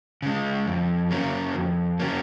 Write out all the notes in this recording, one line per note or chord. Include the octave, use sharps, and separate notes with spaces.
C#3 G#3
F2
C#3 F#3 A#3 C#4
F2
C#3 F#3 A#3 C#4